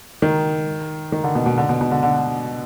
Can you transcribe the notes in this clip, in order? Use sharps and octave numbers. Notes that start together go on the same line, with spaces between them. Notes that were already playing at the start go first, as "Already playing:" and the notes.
D#3
D#3
D3
B2
B2
D3
B2
B2
D3
D3